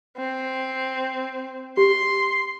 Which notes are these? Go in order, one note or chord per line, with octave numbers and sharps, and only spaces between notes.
C4
G4 C6